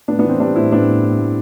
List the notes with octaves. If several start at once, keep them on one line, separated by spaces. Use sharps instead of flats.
A2 B3 D4
E3 B3 D4
C4
G3 B3 D4
A2 C4 E4
A2 B3 D4
A2
A2
A2